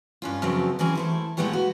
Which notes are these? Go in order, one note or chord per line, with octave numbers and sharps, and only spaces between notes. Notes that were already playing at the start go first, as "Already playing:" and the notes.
G2 C#4 F4
F#2 C#3 F3 F#3 B3 C4
E3 F#3 C4 C#4 G#4
A3 E4 C5
A#2 G#3 A3 B3 G4 C#5
F#4